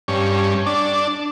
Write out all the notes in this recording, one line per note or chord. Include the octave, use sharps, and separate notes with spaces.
G2 C#4
D4